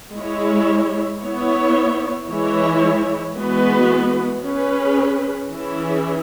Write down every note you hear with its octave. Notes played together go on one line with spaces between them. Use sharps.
G#3 E4 C#5
B3 E4 C#5
E3 G#3 E4 C#5
E3 G#3 B3 F#4 B4
C#4 G#4 B4
E3 C#4 E4 G#4